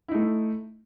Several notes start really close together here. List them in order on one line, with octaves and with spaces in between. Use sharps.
E4 D#4 A3